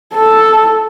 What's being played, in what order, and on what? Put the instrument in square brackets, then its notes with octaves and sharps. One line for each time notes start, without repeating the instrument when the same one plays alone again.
[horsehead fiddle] A4